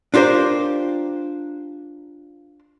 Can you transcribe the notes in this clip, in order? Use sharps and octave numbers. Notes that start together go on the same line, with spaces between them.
D4 F4 G4 A#4 C5